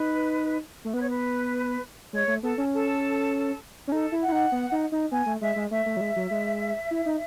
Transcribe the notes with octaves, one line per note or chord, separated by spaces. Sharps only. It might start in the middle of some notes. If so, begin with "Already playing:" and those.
Already playing: D#4 B4
A3
B3 B4
C#5
B4
G#3 C#5
A3
B3 A4
C#4
A4
C#4
D#4 A4
E4
F#5
E4
D#4
B3
D#4
D#4
B3 G#5
A3
G#3 E5
G#3
A3 E5
A3
F#3
G#3
F#3
G#3
E4
D#4